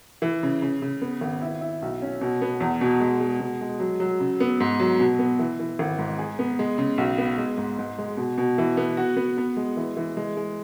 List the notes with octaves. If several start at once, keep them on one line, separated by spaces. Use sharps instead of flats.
E3
C#3
C#3
C#3
B3
G#1
E4
E4
B1
C#4
B2
B3
E2
B2
G#3
G#3
B2
G#3
F#3
F#3
C#3
B3
G#2
F#3
B2
B3
E3
E3
G#1
G#2
G#4
B3
G#3
C#3
B1
B3
G#3
G#2
G#2
G#3
B2
B2
E3
B3
F#4
B3
B3
G#3
E3
E3
G#3
G#3